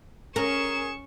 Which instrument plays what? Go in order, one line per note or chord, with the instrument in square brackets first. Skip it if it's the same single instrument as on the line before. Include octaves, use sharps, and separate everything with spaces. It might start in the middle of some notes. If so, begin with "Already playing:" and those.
[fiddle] C#4 [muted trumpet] G#4 [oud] A#4 [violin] C#6 E7